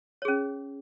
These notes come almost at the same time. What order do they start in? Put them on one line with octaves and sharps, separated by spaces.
C#5 G#4 C#4